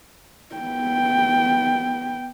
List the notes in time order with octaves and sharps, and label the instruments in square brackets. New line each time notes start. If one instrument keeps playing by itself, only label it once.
[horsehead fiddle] B3 G5